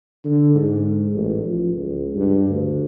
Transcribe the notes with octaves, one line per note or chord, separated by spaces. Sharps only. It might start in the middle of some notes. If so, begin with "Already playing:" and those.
D3
G#2
A1
F3
C#2
G2
D2